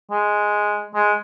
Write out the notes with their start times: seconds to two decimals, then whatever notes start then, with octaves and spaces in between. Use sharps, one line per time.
0.11 G#3
0.95 G#3